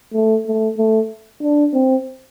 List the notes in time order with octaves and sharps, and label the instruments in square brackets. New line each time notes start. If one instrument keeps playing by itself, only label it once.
[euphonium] A3
A3
A3
D4
C4